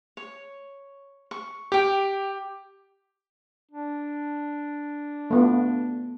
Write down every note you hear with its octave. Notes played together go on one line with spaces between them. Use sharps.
C#5
C#6
G4 G5 D6
D4
A3 B3 F4